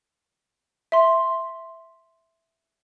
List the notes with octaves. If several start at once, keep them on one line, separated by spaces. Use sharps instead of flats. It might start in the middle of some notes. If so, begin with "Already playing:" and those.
E5 C6